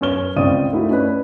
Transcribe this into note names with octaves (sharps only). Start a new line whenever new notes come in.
F#2 B4 C#5 F6 G7
C#2 C4 D5 F5 D#6 D#7
A3 D#4 E4 F#4
C#4 B4 D5